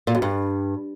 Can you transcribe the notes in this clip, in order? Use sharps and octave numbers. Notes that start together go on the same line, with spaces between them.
A#2
F#2
G2